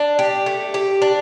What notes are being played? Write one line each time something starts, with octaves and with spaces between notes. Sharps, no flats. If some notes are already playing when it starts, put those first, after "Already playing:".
Already playing: D4
G4
A3
G4
D4